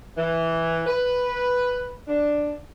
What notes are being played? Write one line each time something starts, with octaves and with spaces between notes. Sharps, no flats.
E3
B4
D4